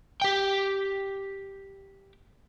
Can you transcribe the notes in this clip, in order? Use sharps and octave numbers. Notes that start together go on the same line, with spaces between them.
G4 G5